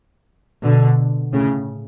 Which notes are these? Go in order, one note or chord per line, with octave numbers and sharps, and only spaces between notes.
B2 D3
A2 C#3